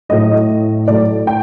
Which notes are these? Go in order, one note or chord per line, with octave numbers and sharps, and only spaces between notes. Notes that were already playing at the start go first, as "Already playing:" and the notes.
A2 F#3 A3 D#5
A2 F#3 A3 D5
G5